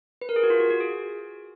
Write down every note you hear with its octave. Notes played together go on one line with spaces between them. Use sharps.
B4
A#4
G#4
F#4
F4
F#4
F#4
G#4